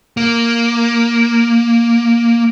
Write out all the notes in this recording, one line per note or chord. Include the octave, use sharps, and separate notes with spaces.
A#3